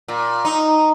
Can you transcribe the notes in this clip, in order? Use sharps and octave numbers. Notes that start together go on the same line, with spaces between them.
A#2
D#4